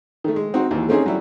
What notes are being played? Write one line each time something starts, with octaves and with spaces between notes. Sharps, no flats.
D#3 A3
G#3
C4 D#4 F#4
D#2 E3
A3 C4 C#4 D#4 G#4
F#3 G3 E4